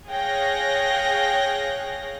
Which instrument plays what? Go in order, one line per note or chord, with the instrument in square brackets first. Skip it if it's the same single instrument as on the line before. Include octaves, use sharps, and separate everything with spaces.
[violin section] G#4 C#5 F5 G5 F#6 A#6